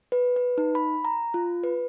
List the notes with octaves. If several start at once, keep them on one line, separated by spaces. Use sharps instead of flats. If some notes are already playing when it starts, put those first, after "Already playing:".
B4
B4
D#4
B5
A#5
F4
B4